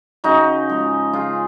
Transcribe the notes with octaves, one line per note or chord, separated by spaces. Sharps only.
C#3 D#4 F#4
F3 G#3
C#3 F4 G#4